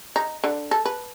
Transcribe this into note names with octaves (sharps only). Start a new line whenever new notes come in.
D#4
D3
A4
B4